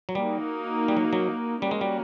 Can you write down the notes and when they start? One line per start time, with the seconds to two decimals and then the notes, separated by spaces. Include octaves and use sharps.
0.09 F#3
0.15 G3 A#3 D#4 F#4
0.88 G3
0.97 F#3
1.13 F#3
1.62 G3 A#3 C#4 F#4 A#4
1.71 G#3
1.81 G3